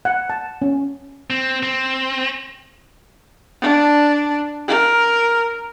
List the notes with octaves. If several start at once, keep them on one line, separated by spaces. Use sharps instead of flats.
F#5
A5
C#4
C4
C4
D4
A#4